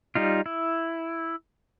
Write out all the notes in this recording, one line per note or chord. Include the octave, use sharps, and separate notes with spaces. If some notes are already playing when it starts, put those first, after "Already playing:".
G3 D#4 F4
E4